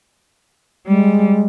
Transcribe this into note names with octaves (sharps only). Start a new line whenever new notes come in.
G3 G#3